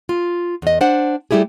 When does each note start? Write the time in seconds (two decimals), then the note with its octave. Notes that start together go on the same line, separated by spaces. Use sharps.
0.09 F4
0.62 E2 D#5
0.81 D4 C5 F#5
1.31 G3 A3 E4 G4 G#4